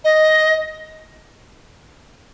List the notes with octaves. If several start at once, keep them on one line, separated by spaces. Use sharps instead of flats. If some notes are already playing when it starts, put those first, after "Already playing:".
D#5